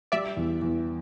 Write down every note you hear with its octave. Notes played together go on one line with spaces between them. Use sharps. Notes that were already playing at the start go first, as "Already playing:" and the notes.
G3 D5 E5
E2
E2